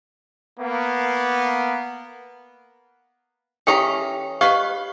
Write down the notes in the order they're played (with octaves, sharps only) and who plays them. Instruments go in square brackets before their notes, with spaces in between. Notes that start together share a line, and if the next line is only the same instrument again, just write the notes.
[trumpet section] A#3 B3
[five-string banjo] E3 C#4 A#5 [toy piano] G4 A4 G5
[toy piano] G4 D#5 C#6 [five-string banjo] B4 F5